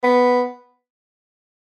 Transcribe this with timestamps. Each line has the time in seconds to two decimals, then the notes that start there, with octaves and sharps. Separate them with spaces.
0.04 B3